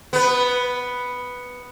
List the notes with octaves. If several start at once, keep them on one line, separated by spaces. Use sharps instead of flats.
B3 B4